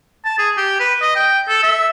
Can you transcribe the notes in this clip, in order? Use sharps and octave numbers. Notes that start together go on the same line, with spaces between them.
A5
G#4
G4
B4
D#5
G5
A4
E5